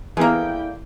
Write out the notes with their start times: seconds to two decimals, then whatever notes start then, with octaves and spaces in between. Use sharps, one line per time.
0.17 D3 E3 A#3 B3 E4 G#4 A#4 G5